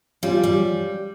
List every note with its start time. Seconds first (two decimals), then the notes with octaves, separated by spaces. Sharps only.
0.22 G3 C#4 F4
0.43 G3